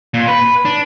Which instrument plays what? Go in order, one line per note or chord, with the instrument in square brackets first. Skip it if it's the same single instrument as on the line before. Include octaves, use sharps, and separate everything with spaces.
[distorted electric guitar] A#2
B4
D4